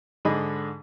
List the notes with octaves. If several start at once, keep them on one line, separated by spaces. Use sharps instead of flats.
G#2 D3 G#4 D#5 B5 D#6